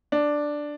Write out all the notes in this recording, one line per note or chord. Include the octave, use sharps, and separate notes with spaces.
D4